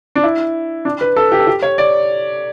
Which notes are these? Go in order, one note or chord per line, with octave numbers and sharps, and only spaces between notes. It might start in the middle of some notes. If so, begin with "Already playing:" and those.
D4
E4
D4
B4
A4
G4
A4
G4
C#5
D5